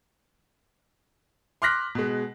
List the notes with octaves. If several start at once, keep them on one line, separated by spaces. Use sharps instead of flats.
C6 D6 F6 F#6 A#6 B6
B2 G#3